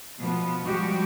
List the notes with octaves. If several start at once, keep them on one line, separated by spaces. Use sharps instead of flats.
B2 F3 B3
F3 G3 G#3 F#4 G4